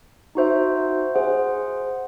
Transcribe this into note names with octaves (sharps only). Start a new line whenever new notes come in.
D#4 F#4 C5 E5
G#4 C5 F#5